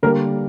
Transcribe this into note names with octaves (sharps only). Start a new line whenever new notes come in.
D3 G3 A#3 A#4